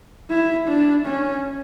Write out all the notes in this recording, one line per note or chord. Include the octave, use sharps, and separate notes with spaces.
E4
D4
C#4